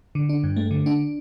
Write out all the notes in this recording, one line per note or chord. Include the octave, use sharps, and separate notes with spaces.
D3
D4
G2
A3
D3
D4